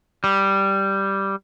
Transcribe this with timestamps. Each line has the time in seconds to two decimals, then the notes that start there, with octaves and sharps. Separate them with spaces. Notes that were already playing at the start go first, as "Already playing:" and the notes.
0.24 G3